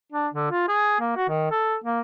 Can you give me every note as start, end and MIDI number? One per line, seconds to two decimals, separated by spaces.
0.13 0.28 62
0.34 0.50 50
0.51 0.65 65
0.69 1.00 68
1.00 1.12 58
1.17 1.29 66
1.29 1.50 51
1.51 1.75 69
1.84 2.01 58